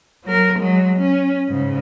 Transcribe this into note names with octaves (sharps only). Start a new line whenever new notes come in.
F#3 A#4
F#3 G#3
C#4
G#2 C#3